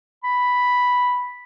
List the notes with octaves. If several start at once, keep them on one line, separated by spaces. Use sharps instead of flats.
B5